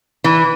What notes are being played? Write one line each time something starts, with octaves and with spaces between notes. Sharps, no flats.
E3